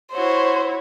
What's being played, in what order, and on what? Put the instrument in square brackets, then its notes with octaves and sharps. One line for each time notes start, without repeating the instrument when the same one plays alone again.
[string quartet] E4 F#4 C#5 [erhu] C5